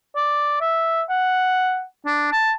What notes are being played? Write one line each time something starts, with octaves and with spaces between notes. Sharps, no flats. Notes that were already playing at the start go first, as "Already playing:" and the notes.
D5
E5
F#5
D4
A5